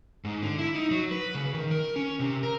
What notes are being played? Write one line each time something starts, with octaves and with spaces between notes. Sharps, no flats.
G#2
D3
E4
D#4
F#3
B4
C#3
D#3
A#4
C#4
C3
A#4